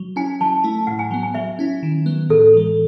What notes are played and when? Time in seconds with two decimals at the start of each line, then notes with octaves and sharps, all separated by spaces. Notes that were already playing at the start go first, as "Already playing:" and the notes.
Already playing: F#3
0.16 C#4 E4 G#5
0.41 F#3 A5
0.64 A3 E4
0.87 A2 F#5
0.99 G#5
1.11 F#3 B3 G#5
1.23 G#5
1.34 F#3 E5
1.59 C#4 E4
1.83 D#3
2.06 F#3 B3
2.30 A2 A4
2.54 E3 G#3